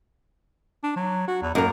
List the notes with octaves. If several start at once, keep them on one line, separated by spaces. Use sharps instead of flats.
D4
F#3
F#4
E2
F#2 A#3 A#4